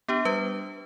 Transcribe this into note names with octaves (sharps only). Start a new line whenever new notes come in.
B3 D4 G4
G3 B4